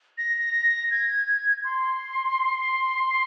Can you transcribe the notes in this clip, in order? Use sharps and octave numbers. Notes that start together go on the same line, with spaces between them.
A#6
G#6
C6